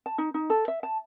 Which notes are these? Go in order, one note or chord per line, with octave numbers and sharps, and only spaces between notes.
A5
D#4
D#4
A4
E5
A5